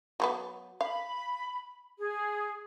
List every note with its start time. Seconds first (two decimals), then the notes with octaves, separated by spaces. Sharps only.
0.20 F#3 A#3 B3
0.81 F5 B5
1.99 G#4